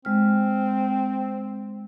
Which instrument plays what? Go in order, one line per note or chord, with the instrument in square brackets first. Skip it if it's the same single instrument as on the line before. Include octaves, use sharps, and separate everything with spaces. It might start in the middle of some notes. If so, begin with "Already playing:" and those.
[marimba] G#3 F6 [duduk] C4